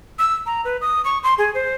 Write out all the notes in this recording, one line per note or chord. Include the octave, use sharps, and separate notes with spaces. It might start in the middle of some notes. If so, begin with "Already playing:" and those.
E6
A#5
B4
D#6
C#6
C6
G#4
C5